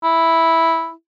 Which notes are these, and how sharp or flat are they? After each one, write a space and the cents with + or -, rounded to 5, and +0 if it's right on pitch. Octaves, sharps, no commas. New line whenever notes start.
E4 -5